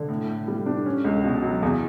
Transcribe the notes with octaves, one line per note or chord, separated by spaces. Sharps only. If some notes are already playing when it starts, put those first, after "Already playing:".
Already playing: D3
A2
A2
G3
D4
C#4
C#2
B2
F#3
E2